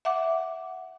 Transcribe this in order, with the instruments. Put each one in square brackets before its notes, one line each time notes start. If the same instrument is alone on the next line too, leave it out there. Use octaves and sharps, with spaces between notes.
[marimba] E5 F#5 D6